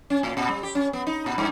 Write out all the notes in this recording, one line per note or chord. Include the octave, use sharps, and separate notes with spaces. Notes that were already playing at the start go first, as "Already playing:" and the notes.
C#4
A2
A#2
G3
G4
C#4
B3
D#4
A#2
G2